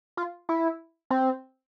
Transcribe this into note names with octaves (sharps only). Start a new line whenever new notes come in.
F4
E4
C4